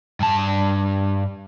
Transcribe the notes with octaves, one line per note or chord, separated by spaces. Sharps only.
G2 A5